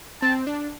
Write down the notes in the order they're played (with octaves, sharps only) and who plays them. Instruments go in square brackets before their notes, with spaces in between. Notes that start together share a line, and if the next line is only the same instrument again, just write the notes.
[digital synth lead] C4 [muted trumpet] A5
[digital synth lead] D4